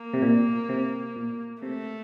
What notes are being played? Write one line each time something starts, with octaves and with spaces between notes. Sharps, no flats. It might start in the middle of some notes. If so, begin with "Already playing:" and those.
Already playing: A#3
C3
A#2
C3
A#2
C3 A3